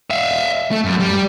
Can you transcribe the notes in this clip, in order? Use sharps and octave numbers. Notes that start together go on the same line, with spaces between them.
E5 F5
A3
F#2
G3